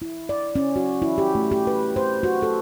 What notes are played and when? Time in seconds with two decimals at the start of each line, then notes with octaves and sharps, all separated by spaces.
0.02 E4
0.29 D5
0.56 C#4
0.76 F#4
1.02 E4
1.18 G4
1.35 A3
1.51 G4
1.67 B4
1.96 C5
2.23 F#4
2.42 A4